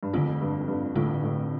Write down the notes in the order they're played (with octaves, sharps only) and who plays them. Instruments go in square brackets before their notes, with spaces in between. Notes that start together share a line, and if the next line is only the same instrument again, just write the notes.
[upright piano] G2
[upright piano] F2 [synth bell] D3 A3 C4 F4
[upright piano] G2
F2
G2
[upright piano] A2 [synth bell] D3 A3 C4 F4
[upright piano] A2